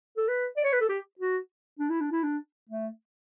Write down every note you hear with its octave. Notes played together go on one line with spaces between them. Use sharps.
A4
B4
D5
C#5
B4
A4
G4
F#4
D4
E4
D4
E4
D4
A3